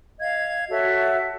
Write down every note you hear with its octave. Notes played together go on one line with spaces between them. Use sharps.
D#5 F5 G#6
F#4 A4 C#5 E5